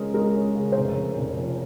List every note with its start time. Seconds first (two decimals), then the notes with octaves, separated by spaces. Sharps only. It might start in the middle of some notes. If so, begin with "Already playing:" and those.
Already playing: C#2 G#3 C#4 A#4
0.14 G#3 A#4
0.35 C#4
0.55 C#3
0.72 C5
0.76 F1 A#4
0.97 F1
1.18 F1
1.39 F2